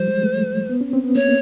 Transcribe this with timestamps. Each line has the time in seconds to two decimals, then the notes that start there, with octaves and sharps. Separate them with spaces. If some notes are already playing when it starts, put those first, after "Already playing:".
Already playing: F3 G3 C5
0.08 G#3
0.23 A3
0.69 B3
0.81 C#4
0.93 C4
1.04 B3
1.15 A#3 C#5